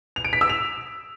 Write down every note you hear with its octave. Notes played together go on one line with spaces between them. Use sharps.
F7
D7
B6
E6
F7